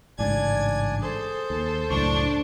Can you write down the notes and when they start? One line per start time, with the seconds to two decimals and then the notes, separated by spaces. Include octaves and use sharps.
0.19 A1 G#2 C#3 D4 D5 G#5 G#6
1.01 G#4 A4 C5
1.50 D#2
1.90 C#2 F#2 A2 D4 C#6